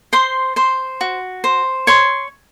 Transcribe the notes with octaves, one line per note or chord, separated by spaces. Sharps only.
C5 C6
C5 C6
F#4
C5
C#5 C6